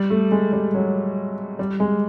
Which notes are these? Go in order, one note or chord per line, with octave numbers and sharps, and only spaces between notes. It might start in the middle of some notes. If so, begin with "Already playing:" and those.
Already playing: G3
A3
G#3
G3
F#3
G3
G#3